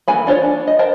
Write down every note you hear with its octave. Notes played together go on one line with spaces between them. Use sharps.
E3 A#3 A4 G#5 B5
D4 F4 C5 C#5
D4
D#5
A#4 C5 G5 A5